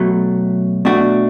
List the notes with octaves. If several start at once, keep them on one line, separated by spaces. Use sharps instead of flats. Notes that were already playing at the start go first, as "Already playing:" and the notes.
Already playing: B2 F#3 A3
B2 A3 D4 F#4